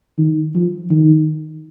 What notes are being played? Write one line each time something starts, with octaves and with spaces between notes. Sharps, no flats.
D#3
F3
D#3